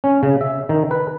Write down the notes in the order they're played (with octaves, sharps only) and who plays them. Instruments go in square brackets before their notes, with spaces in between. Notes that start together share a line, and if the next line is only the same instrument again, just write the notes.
[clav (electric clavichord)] C#4
C#3
E5
D#3
B4